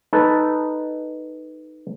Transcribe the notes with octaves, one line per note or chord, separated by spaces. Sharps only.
D#4 A4 B4